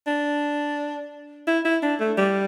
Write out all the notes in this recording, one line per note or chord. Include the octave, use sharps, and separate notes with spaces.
D4
E4
E4
D4
A3
G3